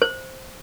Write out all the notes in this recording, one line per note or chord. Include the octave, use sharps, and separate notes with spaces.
C5